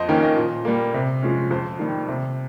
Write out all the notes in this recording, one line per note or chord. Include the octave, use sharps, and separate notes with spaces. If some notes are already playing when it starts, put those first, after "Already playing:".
Already playing: F2 C5 D#5
D#3 A#3 C#4 G5
D#5
A#2
G3 A#3
C3
F3 G#3 C#4
F2 C5
D#3 G3
C3